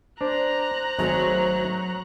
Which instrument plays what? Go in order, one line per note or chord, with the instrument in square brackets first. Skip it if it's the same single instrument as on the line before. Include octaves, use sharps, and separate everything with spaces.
[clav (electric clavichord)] D4 [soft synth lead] C5 [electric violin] A#5 F#6
[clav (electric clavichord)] G#1 G#3 A3 [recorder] F#3